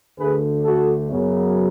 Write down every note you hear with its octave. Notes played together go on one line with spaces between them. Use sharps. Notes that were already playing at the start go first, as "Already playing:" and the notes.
D2 D3 A3 G#4 B4
F#4 A4
F#2 C#3 F#3 B3